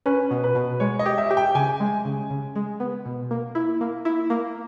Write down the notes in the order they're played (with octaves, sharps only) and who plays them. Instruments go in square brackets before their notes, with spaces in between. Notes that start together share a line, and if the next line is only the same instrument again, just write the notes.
[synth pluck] C#4 [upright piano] B4
[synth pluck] B2
[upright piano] B4
[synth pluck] B2
[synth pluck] G#3 [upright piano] C#5
[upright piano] D#5
[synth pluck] G4
[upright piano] E5
[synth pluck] G4
[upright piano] G5
[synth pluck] C#3 [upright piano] G#5
[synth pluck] G#3
C#3
C#3
G#3
B3
B2
A#3
E4
A#3
E4
A#3